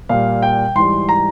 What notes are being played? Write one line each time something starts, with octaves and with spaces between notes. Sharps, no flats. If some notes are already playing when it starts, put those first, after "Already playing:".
A#2 G3 F5
G5
G#2 E3 G3 C6
A#5